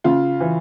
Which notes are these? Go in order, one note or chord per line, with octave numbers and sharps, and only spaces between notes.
C#3 F4
E3